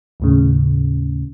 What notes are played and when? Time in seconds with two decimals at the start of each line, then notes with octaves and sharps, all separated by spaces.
0.20 D#2 A2 C#3